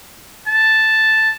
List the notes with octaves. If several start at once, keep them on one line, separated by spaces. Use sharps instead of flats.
A5